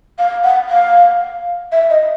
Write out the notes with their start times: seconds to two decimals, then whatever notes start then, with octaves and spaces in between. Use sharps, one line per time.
0.19 F5
0.44 F#5
0.69 F5
1.72 E5
1.90 D#5